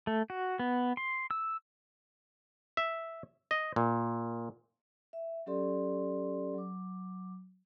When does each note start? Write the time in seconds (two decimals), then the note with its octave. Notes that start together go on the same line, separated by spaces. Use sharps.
0.07 A3
0.30 F#4
0.59 B3
0.97 C6
1.31 E6
2.77 E5
3.51 D#5
3.76 A#2
5.13 E5
5.46 F#3 C#4 G4 A4 D5 C6
6.54 F#3 D6